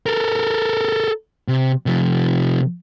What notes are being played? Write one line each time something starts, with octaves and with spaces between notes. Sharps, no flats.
A4 A#4
C3
C3 F3